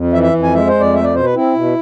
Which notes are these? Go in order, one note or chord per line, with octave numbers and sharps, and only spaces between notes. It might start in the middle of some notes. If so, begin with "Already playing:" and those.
Already playing: F2
E3 E5
E5
F2
G#5
G#3 E5
C5
F2
D5
A3 E5
D5
B2 C5
B4
C4 E4
B2